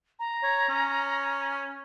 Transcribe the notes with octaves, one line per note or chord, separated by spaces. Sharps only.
A#5
C#5
C#4